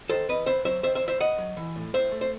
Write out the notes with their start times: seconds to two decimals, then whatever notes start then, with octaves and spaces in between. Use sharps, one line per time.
0.10 D#3 A4 C5
0.29 E2 B4 D#5
0.46 B3 C5 E5
0.65 F#3 C5 E5
0.83 D#3 C5 E5
0.95 C5 E5
1.03 E2
1.08 C5 E5
1.20 B3 D#5 F#5
1.38 F#3
1.57 E3
1.76 A2
1.93 A2 C5 E5
2.11 A3
2.21 C5